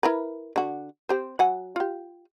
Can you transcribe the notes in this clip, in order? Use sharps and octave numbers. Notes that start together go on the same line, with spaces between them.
E4 A#4 B4
D3 F#4
C4 G4 C5
F#3 F#5 G#5
F4 G4